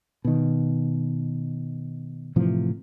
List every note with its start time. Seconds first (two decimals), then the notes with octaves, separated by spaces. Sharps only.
0.25 B2 D#3
2.36 A2 C3 E3 F3